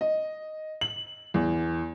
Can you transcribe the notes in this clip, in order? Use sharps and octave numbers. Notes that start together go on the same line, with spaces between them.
D#5
F#7
E2